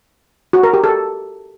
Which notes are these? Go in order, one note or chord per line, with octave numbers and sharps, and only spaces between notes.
F#4
A#4
G4
A4